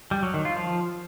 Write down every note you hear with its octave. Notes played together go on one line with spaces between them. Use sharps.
G3
F#3
D#3
F4
F3